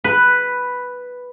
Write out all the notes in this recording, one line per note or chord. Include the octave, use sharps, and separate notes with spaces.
B4